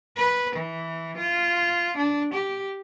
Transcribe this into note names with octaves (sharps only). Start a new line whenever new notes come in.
B4
E3
F4
D4
G4